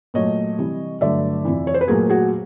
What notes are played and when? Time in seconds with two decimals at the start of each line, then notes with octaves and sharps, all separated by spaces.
0.14 A#2 F#3 A3 C#5 D#5
0.58 C3 E3 G3
1.01 G2 D3 F#3 A3 D5 E5
1.45 F2 C3 E3
1.67 C#5
1.74 C5
1.81 B4
1.88 A#2 F#3 A3 G#4 A#4
2.09 F#4 G#4